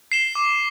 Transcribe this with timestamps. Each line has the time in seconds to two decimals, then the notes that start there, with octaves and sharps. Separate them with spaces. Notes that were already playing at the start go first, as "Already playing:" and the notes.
0.12 C7 E7 G7
0.35 D6